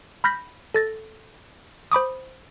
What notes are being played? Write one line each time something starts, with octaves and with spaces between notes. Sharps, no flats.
B5 F6 G6 A#6 B6
A4 A6 A#6
C5 B5 D6 D#6